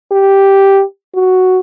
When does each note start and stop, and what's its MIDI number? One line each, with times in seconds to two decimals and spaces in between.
0.11 0.82 67
1.15 1.60 66